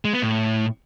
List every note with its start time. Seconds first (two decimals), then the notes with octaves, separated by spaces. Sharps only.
0.05 G#3
0.13 B3
0.22 A2